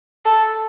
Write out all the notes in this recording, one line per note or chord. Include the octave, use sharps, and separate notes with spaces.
A4